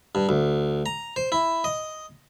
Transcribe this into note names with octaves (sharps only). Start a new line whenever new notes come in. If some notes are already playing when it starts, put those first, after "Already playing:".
G2
D2
A#5
C5
E4
D#5